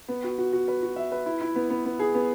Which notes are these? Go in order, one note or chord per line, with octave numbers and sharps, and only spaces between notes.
B3
F#4
F#4
F#4
B4
F#4
E5
B4
E4
E4
B3
B3
B3
G#4
B3